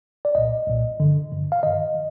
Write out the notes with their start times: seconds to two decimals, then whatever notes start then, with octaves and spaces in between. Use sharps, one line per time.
0.25 D5
0.35 C2 A#2 D#5
0.67 C2 A#2
1.00 G2 D3
1.31 G2 D3
1.52 F5
1.63 G2 D#3 D#5
1.95 D#3